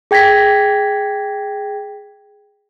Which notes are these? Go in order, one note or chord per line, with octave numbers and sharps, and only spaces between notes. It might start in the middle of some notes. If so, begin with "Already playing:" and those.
G#4 G5 G#6 A#6 B6